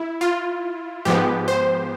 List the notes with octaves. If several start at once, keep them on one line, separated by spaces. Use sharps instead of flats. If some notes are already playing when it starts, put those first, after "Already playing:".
Already playing: E4
F4
G#2 F3 G#3 B3 G4
C5